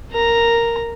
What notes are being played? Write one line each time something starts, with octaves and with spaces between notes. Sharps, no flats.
A#4 A#5